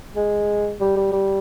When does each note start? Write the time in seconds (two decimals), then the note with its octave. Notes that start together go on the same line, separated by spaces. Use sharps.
0.16 G#3
0.80 G3
0.96 G3
1.12 G3